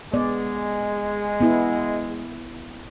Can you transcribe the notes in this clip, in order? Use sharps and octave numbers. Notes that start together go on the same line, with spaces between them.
G#3 B3 D5
B3 E4